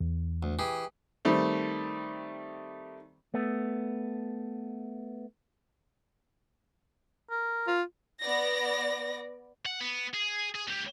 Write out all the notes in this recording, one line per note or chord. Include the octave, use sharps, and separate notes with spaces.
E2
D2
E3 G4 G#4
D#3 G3 A3 C4
A3 B3
A#4
F4
B3 D5 A#6
F#5
B3
G#4
G#4
C#2 G4